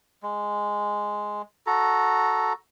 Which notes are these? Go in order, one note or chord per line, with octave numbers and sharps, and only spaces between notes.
G#3
F#4 A4 A#5